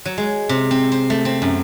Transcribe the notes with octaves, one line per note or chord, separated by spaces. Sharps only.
F#3
G#3
C3
C4
C5
A3
C4
F#2